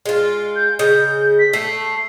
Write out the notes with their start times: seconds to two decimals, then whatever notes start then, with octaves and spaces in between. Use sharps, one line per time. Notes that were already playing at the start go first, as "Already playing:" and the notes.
0.06 G#3 F4
0.56 G6
0.79 C#3 D#5 G6
1.39 B6
1.53 A3 C7